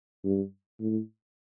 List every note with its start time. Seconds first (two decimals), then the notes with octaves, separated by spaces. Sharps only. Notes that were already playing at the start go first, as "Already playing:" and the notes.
0.24 G2
0.80 A2